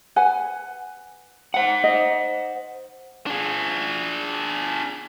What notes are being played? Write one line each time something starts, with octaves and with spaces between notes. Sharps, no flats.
B4 F#5 G#5
C5 F#5
D#5
D4 G#4